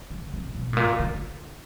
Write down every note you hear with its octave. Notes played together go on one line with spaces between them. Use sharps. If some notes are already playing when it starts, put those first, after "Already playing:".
D3
C3
B2
A2
A#2
D3